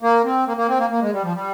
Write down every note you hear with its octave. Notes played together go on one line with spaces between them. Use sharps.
A#3
C4
A#3
A#3
C4
A#3
A#3
G#3
G3
F3
G3